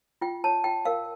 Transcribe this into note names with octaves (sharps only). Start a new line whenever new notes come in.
F4 G5
C#5 A5
F4 G5
A#4 F5